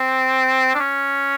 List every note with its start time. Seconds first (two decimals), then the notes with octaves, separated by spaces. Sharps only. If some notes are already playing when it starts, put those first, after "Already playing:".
Already playing: C4
0.75 D4
0.80 C#4